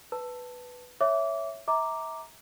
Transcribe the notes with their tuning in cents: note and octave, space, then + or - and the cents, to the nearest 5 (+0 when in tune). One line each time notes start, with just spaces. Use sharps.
B4 +0 A5 +10
C#5 +0 E5 +0 D6 -20
E5 -30 A#5 -5 D6 +0